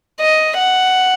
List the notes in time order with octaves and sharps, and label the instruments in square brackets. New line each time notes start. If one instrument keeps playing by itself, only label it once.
[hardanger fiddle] D#5
F#5